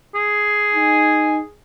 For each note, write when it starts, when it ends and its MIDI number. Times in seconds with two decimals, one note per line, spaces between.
0.15 1.55 68
0.75 1.40 63
0.75 1.40 80